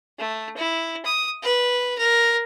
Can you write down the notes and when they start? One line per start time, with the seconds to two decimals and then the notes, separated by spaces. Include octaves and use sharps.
0.19 A3
0.57 E4
1.05 D#6
1.43 B4
1.98 A#4